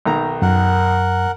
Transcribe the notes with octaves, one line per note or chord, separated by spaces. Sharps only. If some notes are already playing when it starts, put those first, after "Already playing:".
B1 D#3 A#5
F#2 A#4 F#5